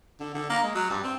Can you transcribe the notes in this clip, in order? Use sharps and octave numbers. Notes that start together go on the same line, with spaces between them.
D3
D3
A#3
G#3
F#3
G2
C4